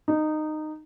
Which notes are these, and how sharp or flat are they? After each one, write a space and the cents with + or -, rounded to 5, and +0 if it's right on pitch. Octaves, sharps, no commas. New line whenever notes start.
D#4 -15